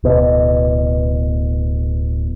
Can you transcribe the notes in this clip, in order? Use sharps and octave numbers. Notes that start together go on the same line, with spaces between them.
D1 B2